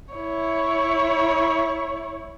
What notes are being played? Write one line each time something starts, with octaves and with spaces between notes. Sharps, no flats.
E4 C#5